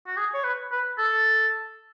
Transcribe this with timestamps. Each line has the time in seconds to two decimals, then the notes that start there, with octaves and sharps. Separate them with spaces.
0.07 F#4
0.17 G#4
0.34 C#5
0.44 B4
0.72 B4
0.98 A4